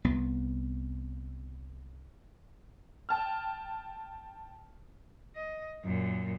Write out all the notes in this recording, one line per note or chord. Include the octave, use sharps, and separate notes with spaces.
C2 B3
G5 A5 F6
D#5
F#2 A#2